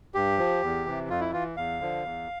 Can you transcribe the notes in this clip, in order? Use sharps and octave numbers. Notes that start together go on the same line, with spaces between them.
G2 G4
F3
E2
C3 E3
F2 F4
E4
E3 F4
E2 F5
D3 F3
E2